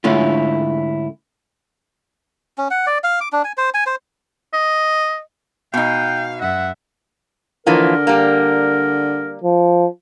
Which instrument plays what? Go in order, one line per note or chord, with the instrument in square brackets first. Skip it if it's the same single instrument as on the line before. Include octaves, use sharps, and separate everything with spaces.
[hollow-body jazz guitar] G#2 D3 A3 C#4 E4 F4
[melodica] C#4
F#5
D5
F5
D6
D4
G#5
C5
G#5
C5
[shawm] D#5
[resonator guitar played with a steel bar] B2 D#4 [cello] F5 [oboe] G5
[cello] F#2 E5 [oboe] F#5
[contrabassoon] D3 [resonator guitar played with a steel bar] E3 F3 A#3 [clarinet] A#4
[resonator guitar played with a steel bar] G3 A#3
[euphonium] F3